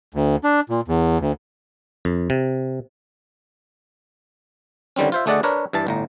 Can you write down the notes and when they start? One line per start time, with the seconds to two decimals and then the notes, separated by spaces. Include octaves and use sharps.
0.14 D2
0.44 D4
0.70 A#2
0.88 E2
1.20 D2
2.05 F2
2.30 C3
4.96 D3 D#3 G3 C4 C#4
5.12 F4 C5 E5
5.26 D2 A3 G#4 D5 D#5 F#5
5.43 D4 A#4 B4 C#5
5.73 G2 E3 A5
5.87 G1 A2 A#5